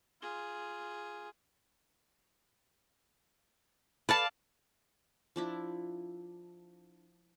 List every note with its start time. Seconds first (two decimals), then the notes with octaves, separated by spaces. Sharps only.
0.21 F4 G#4
4.09 A4 B4 D5 F5 A5
5.36 F3 D4 E4